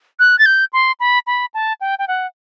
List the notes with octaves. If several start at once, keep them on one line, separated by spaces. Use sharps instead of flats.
F#6
A6
G6
C6
B5
B5
A5
G5
G5
F#5